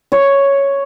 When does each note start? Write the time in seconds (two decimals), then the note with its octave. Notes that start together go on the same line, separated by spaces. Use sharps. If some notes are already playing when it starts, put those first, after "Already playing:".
0.12 C#5